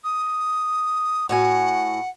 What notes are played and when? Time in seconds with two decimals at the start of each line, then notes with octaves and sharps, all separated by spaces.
0.04 D#6
1.29 A2 F#4 F#5 G#5